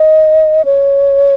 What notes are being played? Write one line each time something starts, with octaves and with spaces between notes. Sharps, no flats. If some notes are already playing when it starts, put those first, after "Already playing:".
Already playing: D#5
C#5